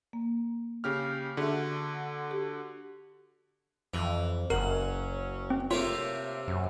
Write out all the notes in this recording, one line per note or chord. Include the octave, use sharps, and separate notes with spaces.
A#3
C#3 G4 F6
D3 F#4 G#4 E5
G4
F2 E3
F#1 F#3 C#4 A#4 F#5
C4
C3 A3 A#3 F4 C#5
F#2